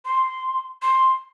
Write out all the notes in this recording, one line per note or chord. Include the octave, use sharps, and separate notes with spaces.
C6
C6